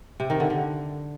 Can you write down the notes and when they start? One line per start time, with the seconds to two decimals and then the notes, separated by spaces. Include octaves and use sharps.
0.20 C3
0.30 D#3
0.40 D3
0.50 D3